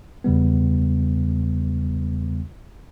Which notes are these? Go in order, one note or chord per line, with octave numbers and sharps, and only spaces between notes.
E2 C#3 G3 B3